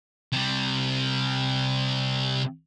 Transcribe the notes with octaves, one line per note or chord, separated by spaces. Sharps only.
C3 G3